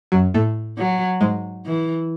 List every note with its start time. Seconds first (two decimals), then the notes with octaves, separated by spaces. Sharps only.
0.12 F#2 F#3
0.34 A2 A3
0.78 F#3
1.21 G#2 G#3
1.65 E3